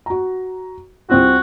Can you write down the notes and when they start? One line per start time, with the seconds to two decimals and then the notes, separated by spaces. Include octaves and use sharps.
0.06 F#4 A#5
1.10 C2 C4 F4 F#4